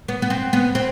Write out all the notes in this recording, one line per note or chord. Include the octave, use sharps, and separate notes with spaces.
B3
B3
C4
B3
C4